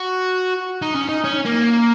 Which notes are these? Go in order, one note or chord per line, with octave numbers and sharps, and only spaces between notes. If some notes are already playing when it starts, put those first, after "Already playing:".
Already playing: F#4
D#4
C#4
D#4
C#4
A#3